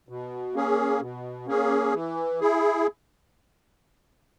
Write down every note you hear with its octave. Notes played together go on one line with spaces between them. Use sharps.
B2
A#3 C#4 G#4
B2
A#3 C#4 G#4
E3
E4 G#4